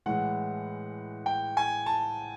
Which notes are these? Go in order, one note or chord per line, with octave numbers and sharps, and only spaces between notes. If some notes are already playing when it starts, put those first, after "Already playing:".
A2 E3 G#3 F#5
G5
G#5
A5